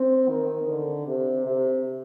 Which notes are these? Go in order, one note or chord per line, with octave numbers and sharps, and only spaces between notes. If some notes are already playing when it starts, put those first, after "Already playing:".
Already playing: C4
D#3
D3
C3
C3